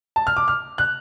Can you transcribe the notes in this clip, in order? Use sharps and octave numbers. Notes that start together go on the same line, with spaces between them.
A5
F6
D6
F6
F#6